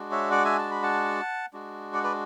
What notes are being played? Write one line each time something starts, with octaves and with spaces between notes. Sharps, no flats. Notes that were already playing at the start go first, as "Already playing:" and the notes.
Already playing: G#3 D4 F#4
C#5 E5
D5 F#5
E5 G#5
A5
B5
F#5 A5
G#3 D4 F#4
D5 F#5
B4 D5